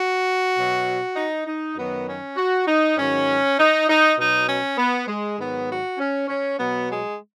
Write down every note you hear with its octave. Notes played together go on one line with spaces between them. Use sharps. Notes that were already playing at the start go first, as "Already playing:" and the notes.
Already playing: F#4
B2 F#3
D#4
D#4
F#2 D#3 F#3 B3
C#4
F#4
D#4
G#2 D#3 F#3 C#4
D#4
D#4
B2 F#3 D#4
C#4
B3
G#3
G#2 D#3 F#3 B3
F#4
C#4
C#4
B2 F#3 B3
G#3